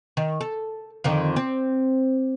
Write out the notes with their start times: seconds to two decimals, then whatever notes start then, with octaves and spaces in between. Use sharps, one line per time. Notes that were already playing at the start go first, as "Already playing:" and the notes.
0.17 D#3
0.41 A4
1.04 F2 D3 D#3
1.36 C4